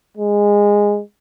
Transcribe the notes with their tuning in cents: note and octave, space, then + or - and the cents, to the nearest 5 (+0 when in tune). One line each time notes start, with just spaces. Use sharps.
G#3 -15